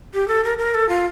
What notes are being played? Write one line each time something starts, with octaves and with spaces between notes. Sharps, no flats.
G4
A4
A#4
A#4
A4
F4